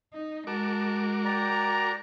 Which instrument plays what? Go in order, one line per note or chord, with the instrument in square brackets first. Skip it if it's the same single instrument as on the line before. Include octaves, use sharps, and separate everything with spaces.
[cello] D#4
[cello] G#3 [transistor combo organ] F#4 A#4 D6 [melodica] A5
[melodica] D5 [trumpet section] G5 A#5